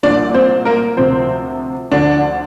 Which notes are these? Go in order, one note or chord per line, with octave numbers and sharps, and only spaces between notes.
C2 A#2 F3 D4 D5
C4 C5
A#3 A#4
D2 C3 F3 C4 C5
D2 D3 F3 D4 D5